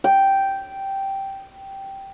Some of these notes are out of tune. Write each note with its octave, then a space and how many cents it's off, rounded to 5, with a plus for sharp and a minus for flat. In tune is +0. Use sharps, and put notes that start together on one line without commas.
G5 -5